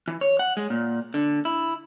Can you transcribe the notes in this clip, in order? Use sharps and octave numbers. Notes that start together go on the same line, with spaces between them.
E3
C#5
F#5
G#3
A#2
D3
E4